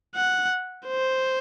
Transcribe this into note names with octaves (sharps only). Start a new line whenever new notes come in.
F#5
C5